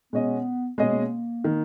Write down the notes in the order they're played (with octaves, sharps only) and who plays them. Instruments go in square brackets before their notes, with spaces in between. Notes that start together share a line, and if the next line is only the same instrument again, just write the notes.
[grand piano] B2 G#3 C#4 G#4 D#5 [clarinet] B3
[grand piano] B2 G#3 C#4 G#4 D#5 [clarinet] A#3
[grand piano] D#3